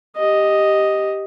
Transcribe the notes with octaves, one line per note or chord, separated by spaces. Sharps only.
G4 D#5